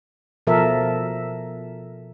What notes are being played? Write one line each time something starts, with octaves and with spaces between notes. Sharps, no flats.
B2 F3 A4 A#4 E5